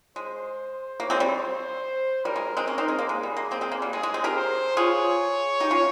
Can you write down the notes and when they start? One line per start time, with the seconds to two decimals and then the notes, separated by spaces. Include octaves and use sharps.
0.16 G#3 C5
1.00 A#3 C#5
1.10 G#3 C4
1.20 G3
1.42 C5
2.25 G3 A#4
2.36 G#3
2.57 G#3 C4
2.67 A#3 C#4
2.78 C4 D#4
2.88 G#3 C4
2.99 A#3
3.09 G#3 G#4
3.23 G3
3.37 A#3
3.51 G#3 C4
3.61 G#3 C4
3.72 A#3
3.82 G3
3.93 G#3 G#4
4.03 G#3
4.14 G#3 C4
4.24 G4 A#4
4.35 C5
4.77 F4 G#4 C#5
5.60 D#4 G4
5.71 C#4 F4